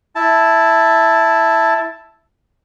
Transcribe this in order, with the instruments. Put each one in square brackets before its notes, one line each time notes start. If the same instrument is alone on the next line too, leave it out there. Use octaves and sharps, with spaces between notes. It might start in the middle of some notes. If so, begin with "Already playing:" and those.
[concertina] E4 A5